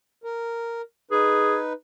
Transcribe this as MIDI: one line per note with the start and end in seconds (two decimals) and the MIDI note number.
0.24 0.82 70
1.11 1.73 63
1.11 1.58 68
1.11 1.73 71